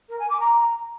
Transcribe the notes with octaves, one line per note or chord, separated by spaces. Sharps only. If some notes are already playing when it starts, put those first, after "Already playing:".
A#4
G#5
D6
A#5